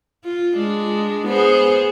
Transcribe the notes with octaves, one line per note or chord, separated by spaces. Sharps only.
F4
G#3 D4
B3 G#4 C5